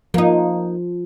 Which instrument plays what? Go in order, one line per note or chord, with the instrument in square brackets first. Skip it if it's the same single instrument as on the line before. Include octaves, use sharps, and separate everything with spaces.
[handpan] F3 [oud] A#3 D#4